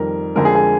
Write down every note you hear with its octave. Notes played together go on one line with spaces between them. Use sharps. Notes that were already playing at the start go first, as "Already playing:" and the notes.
Already playing: F2 D#3 G3 A#4
F2 D3 G#3 A#4
G#4
G#4